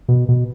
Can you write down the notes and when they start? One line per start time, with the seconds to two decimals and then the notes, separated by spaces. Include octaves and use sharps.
0.09 B2
0.29 B2